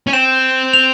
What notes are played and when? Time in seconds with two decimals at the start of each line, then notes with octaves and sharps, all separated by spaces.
0.07 C#4
0.13 C4 E7
0.73 F7